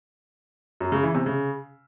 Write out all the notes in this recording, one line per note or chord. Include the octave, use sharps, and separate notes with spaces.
F#2
C#3
E3
C3
C#3